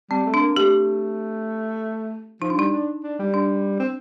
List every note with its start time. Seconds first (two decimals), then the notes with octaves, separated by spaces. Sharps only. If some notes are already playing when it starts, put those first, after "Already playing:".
0.10 G3 C4
0.26 A3
0.34 D4
0.41 A#3
0.56 A3 G4
2.41 F3 D#4
2.50 D4
2.57 G3 D#4
2.73 D4
3.04 D4
3.19 G3
3.34 D4
3.80 C4